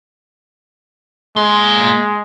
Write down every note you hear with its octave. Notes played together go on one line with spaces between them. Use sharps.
G#3 A#3 C6